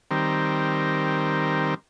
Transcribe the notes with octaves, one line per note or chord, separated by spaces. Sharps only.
D#3 G3 C4 A#4